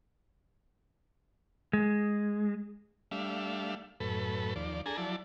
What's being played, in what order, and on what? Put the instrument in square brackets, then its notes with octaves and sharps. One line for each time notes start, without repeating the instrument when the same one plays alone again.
[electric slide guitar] G#3
[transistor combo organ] G3 A3 D4 E5 F5
F#2 A2 A4 B4
D#2 F3 D5
D4 G#4 A4 G#5 A#5
F3 F#3 E4 D5 A5